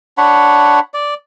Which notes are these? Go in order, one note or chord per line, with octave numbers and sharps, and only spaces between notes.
D4 C#5 F#5 B5
D5